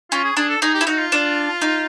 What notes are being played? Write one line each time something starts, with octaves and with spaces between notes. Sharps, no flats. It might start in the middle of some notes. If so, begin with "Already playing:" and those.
C#4 F4
G#4
D4 G#4
A4
D#4 G#4
G4
E4
D#4 F#4
F4
D4
D#4